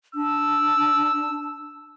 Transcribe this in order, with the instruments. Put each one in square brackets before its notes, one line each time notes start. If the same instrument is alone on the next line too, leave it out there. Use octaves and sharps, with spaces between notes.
[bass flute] D4 [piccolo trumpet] E6